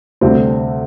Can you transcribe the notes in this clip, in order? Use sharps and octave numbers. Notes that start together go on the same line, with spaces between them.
D2 C3 G3 C4